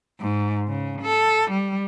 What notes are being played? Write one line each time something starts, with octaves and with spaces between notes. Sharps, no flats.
G#2
C#3
A4
G3